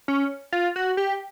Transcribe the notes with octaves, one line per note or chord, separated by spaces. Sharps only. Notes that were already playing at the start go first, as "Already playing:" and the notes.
C#4
F4
F#4
G4